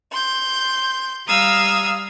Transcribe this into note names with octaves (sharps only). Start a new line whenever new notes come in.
C6 G6
G3 F5 A#5 D#6 E6 G#6